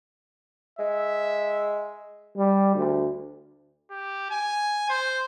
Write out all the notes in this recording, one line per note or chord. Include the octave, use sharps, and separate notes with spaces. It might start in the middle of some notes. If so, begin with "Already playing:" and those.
G#3 E5
G3
D2
G4
G#5
C5